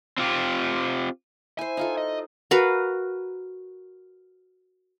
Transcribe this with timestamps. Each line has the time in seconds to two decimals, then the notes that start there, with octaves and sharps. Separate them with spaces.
0.18 C4 F4 G4
1.59 E4 C5 G#5
1.77 D#4 F4 A4
1.98 D#5
2.51 F#4 A#4 B4 F5